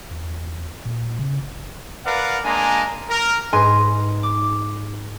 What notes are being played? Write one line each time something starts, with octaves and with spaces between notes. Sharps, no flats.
E2
A#2
C#3
G1
A#4 B4 D5 F5 F#5
G#3 A#3 D4 G#5 A#5
A#4
G#2 D#4 B4 G#5 C6 D#7
D6